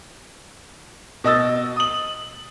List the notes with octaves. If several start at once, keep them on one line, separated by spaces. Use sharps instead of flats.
B2 D#5 E6 A6
D#6 F#7